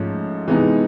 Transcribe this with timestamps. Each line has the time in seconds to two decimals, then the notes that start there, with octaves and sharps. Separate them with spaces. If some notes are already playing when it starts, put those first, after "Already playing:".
Already playing: G#2 F3 A3 C#4
0.47 C3 E3 G#3 B3 D#4